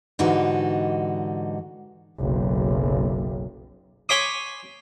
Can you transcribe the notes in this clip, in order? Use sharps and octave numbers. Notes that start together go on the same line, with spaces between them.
G#2 D3 E3 D#4 F#4 G4
F#1 B1
C#5 G#5 B5 C6 D6 D#6